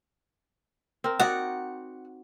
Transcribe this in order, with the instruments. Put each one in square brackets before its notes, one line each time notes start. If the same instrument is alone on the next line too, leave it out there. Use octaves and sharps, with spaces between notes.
[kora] C4 A#4
[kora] D#4 F#4 D5 [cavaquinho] F#5